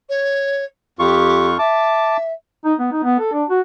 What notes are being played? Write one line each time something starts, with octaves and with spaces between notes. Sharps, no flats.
C#5
F2 F4 G4 C#6
E5 A5 D6
D#4
B3
D#4
B3
A4
D4
F#4